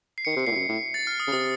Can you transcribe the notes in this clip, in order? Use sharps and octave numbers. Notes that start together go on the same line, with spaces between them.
C7
D#3 C#7
C7
C3
C#7
A#2 C7
A2
F#2 C#7
A2
A6
F6
D#6
C#3
C3 D#6